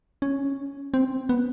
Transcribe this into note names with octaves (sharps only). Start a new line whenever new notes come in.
C#4
C4
B3